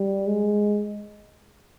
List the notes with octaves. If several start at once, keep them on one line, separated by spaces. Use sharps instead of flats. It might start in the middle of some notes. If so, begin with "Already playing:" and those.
Already playing: G3
G#3